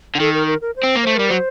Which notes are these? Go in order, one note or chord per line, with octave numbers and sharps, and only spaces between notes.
D3
D#3 A4
A#4
A#4
A#4
C5
C4
A#3
A3 C5
G3 A#4
F#3 C5